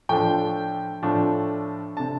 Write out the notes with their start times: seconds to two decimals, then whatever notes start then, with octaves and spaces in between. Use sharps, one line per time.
0.09 A2 F3 A3 D4 G5
1.02 A2 F3 A3 D4
1.96 C3 A3 D4 A5